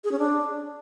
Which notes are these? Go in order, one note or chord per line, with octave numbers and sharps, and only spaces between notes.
G#4
C#4
D4